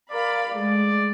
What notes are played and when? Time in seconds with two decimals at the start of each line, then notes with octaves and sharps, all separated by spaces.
0.11 A#4 D5 F5 B5
0.51 G#3 A3 D5